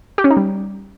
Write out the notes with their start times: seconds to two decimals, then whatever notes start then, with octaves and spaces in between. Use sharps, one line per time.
0.18 G4
0.24 C#4
0.30 D#4
0.37 G3